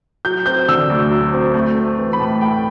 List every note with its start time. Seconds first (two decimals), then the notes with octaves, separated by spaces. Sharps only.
0.25 F#3 G6
0.46 C4 G6
0.69 D3 E6
0.90 D2
1.11 F#3
1.33 C4
1.54 A3
1.76 C4
1.97 E3
2.13 B5
2.19 A2 A5
2.41 A3 G5